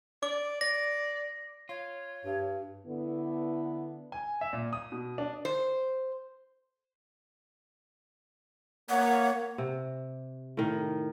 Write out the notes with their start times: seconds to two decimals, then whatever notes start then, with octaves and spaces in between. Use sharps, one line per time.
0.23 D5 D6
0.61 D5 A#6
1.69 F4 C#5
2.25 G2 G4
2.87 D3 B3 E4
4.12 G#5
4.41 E5
4.53 A#2
4.73 D#6
4.92 B2
5.18 D4
5.45 C5
8.90 A#3 C#5 F#5
9.58 C3
10.57 A2 D#3